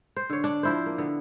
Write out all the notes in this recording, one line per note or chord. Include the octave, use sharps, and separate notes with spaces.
C5
D3 C#5
D4
F3 E4 C5
A#3
D3 B3